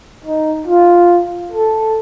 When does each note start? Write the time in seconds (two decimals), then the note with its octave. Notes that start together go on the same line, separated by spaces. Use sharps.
0.24 D#4
0.67 F4
1.52 A4